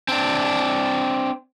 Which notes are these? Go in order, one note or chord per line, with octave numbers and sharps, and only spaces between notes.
C4 D4